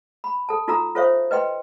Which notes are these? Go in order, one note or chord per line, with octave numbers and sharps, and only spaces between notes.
B5
A4 A5
D#4 F4 F#4 A4 A#5 E6
F4 A4 C5 C#5 E5 F5
B4 D#5 G5 C6